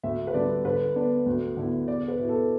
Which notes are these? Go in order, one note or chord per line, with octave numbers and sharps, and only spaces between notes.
D2 E5
B4
D3 G3 D4 D5
D3 B4
B3 D4
D2
D3 B3 E4
E2 D5
B4
B2 B3 E4
A4